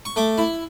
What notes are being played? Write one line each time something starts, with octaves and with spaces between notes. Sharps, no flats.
C#6
A3 D6
E4